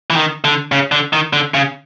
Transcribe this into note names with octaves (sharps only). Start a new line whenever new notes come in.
E3
D#3
D3
C#3
D3
D#3
D3
C#3